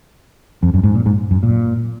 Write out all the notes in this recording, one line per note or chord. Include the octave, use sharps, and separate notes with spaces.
F2
F#2
G#2
A#2
G#2
F#2
A#2